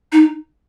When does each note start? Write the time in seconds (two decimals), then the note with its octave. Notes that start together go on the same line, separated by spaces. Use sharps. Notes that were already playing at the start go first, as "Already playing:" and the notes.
0.12 D#4